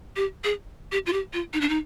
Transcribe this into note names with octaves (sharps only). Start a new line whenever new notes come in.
G4
G#4
G4
F4
G4
F4
D#4
D4
D#4